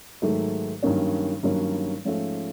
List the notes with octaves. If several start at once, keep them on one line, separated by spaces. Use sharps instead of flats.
G#2 D#3 F#3 A3
G2 D#3 F#3 A#3 C#4
G2 D#3 F#3 A#3 C#4
G#2 F3 A3 C#4 F4